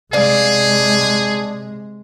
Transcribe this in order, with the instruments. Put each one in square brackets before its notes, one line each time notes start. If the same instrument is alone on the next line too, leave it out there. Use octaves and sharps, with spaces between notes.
[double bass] C3 G#3 [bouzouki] D4 F5 [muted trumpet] G#4